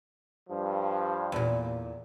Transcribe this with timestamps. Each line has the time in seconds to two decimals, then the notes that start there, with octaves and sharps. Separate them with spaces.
0.49 G2 F3
1.32 E2 A#2